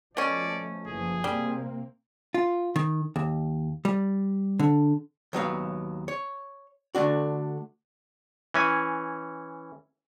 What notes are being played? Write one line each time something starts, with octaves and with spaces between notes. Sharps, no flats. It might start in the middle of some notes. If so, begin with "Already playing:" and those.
B2 F3 A3 C#4 D5
F#1 E3 F3 G#4
C3 G3 A#3 C4
F4
D#3
D#2
G3
D3
D#2 F#3 B3 F5
C#5
D3 A3 D4 F#4
E3 C#4 G#5